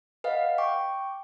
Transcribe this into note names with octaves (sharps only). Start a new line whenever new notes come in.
B4 D#5 F5 F#5
G5 C#6 D6